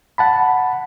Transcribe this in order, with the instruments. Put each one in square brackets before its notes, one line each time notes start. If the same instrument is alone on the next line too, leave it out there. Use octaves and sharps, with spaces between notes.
[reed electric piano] F#5 A5 B5